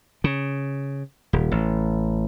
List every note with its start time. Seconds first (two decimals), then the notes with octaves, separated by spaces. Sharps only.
0.24 C#3
1.33 D#1
1.51 A1